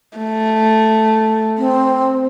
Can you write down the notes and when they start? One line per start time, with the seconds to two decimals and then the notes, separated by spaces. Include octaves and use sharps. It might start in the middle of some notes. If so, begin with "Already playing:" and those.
0.18 A3
1.58 C4